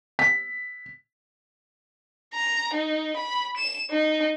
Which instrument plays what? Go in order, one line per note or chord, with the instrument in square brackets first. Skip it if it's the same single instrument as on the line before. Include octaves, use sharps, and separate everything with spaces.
[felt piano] B6
[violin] A#5
D#4
B5
E7
D#4